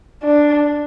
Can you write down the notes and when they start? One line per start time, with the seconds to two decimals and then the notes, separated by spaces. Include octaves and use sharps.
0.23 D4